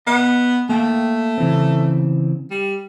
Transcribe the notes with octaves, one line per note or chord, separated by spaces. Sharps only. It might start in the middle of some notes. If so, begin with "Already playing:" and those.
B3 D#5 E5 F#5
A3 A#3 F5 G5
C#3 E3 C4
G3